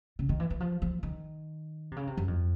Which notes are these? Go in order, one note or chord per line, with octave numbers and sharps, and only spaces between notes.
C#3
D#3
E3
E3
F3
F3
D#3
C3
C#3
C3
F#2
F2